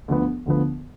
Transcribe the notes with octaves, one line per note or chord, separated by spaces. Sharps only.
D2 D3 F3 B3
D2 D3 F3 B3